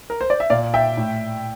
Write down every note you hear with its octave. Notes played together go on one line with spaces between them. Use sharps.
A#4
C5
D5
E5
A#2 D5 F5
E5 G5
A2